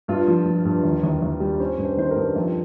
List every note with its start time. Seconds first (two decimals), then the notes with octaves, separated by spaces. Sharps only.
0.08 G2 F4
0.28 F3
0.46 F3
0.65 G2
0.83 D#2
1.03 D#2
1.22 D#2
1.40 G3
1.59 C#4 C5
1.78 G2
1.85 C5
1.97 D#3 C5
2.11 A#4
2.16 G2
2.35 F2 F4